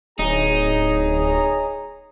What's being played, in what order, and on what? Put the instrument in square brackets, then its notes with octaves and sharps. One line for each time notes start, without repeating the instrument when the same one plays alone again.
[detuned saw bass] D1 [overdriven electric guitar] D#4 [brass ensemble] G#4 C#5 A#5